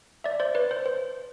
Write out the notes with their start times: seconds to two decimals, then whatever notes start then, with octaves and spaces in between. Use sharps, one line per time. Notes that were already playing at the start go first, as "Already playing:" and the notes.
0.24 D5 E5
0.40 C5 D5
0.55 B4 C#5
0.71 C5
0.86 C5